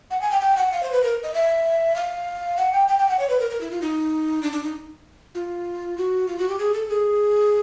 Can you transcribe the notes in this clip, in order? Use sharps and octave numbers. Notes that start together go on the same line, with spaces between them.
F#5
G#5
G5
G5
F#5
F5
C5
B4
A#4
D#5
E5
F5
F#5
G5
G5
G5
F#5
C#5
B4
A#4
A#4
E4
F4
D#4
D4
D4
D#4
F4
F#4
F4
F#4
G4
G#4
A4
G#4